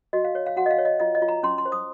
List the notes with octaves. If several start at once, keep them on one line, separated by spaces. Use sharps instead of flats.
F#4 D#5
F5
C#5
F5
F#4 F#5
D#5
F5
C#5
D#5
F4 D#5
D#5
F4
A#5
C#4 C6
C6
C5
D#6